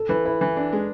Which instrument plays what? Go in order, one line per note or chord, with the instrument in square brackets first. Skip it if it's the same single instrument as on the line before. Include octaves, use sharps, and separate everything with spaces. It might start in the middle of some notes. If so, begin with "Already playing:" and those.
Already playing: [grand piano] A4
[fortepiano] E3 [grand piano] B4
[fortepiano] E4 [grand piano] B4
[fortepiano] E3
D4
G#3